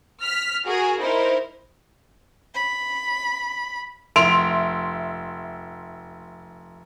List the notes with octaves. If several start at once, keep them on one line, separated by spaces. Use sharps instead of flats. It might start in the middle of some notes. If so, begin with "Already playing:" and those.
F6 B6
F#4 G#4 A#4
D#4 E4 A#4 C5
B5
F1 E5 C6 D7 F7